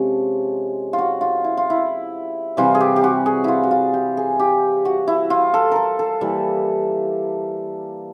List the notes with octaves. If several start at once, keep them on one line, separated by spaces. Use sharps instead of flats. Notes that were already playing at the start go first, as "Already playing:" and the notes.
Already playing: C3 F3 G#3 C#4 A4
F4
F#4
F4
E4
F4
E4
C3 E3 G3 F4
G#4
G4
G4
F#4
G#4
E4 F4
F#4
F4
G4
G#4
G4
F#4
E4
F4
A4
A4 A#4
A4
E3 G3 A#3